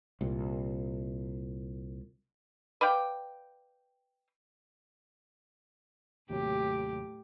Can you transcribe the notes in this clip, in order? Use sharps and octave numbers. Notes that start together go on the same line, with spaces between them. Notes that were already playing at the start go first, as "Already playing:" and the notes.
C2 A#2
B4 D5 F5 G5
D#2 A2 C3 F#3 G4